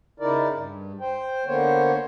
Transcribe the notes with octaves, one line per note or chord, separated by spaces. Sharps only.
C#3 D#4 E4 A#4 D5
G2
C5 G5
D3 A#3 B3 C5 C#5